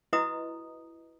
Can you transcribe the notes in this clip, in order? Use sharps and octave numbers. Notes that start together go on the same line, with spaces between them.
E4 F#4 B4 D#5 A#5 D#6